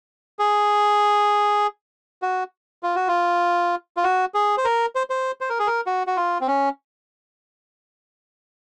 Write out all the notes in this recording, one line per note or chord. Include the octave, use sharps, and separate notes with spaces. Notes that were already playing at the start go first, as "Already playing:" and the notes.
G#4
F#4
F4
F#4
F4
F4
F#4
G#4
C5
A#4
C5
C5
C5
A#4
G#4
A#4
F#4
F#4
F4
C4
C#4